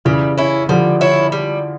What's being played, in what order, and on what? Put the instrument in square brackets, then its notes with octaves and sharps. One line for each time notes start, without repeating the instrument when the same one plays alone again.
[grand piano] C#3 E3 [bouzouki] G3
[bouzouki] C#4 E4
[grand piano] D3 F3 [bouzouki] G3
[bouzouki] C#4 E4
G3